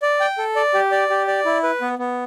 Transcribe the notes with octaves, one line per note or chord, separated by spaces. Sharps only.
D5
G5
A4
D5
G4
D5
G4
D5
E4
B4
B3
B3